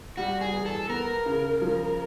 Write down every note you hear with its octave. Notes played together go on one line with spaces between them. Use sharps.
G3 F#4
G#4
E2
A4
B3 A#4
C#3
F3